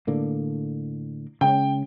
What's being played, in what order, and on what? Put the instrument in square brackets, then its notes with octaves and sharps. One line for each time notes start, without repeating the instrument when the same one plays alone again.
[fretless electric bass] A2 D3 A#3
[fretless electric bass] C#3 G#3 C#4 [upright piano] G5